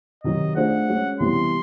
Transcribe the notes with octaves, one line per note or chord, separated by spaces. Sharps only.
C3 D#3 F#3 D#5
A3 D4 F4 G#4 C5 F#5
G#3 C#4 F#4
C3 E3 G3 B3 E4 C6